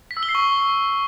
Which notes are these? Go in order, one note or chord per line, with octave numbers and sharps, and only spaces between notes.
B6
E6
G7
C7
C#6